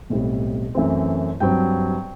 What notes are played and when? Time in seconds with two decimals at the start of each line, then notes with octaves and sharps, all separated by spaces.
0.10 B1 A2 G3 C4
0.75 F#2 E3 A3 C4
1.40 G2 F#3 C4 G5